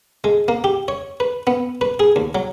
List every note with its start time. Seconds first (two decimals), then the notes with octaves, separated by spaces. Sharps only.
0.24 G#3
0.48 A#3
0.64 G4
0.88 C#5
1.20 B4
1.47 B3
1.81 B4
2.00 G#4
2.16 D#2
2.35 F#3